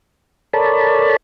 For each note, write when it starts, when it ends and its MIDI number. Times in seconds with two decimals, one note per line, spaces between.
0.53 1.16 69
0.53 1.16 70
0.53 1.16 73
0.53 1.16 74
0.53 1.16 81
0.53 1.16 83